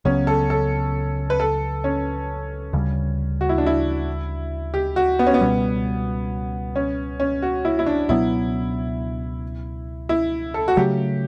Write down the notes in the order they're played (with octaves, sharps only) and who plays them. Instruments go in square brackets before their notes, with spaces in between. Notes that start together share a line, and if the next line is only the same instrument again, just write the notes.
[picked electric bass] C#2 C#3 F#3 B3 [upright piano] C#4
[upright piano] A4
A4
B4
A4
C#4
[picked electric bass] D2 C#3 G3
[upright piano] F#4
E4
D4
E4
G4
F#4
B3
C#4
B3
[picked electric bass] C#2 B2 G3
[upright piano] C#4
C#4
F#4
E4
E4
D4
[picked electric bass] C#2 B2 F#3 B3 [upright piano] E4
[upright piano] E4
A4
F#4
[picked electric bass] C#3 F#3 A3 [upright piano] G4